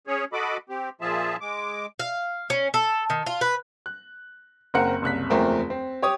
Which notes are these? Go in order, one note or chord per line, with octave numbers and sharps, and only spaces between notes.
C#4 G#4 C#5
F#4 A4 D#5 B5 D6
C4 G4
A#2 F3 F4 G#4 E5 A5
G#3 D6
F5
C#4
A4
D#3
F4
B4
F#6
F#1 C4 A#4 F#5 F#6 C#7
F#1 C2 F#6 B6
F#1 E2 F3 A3 C4 A#4
C4
G4 C#5 D#6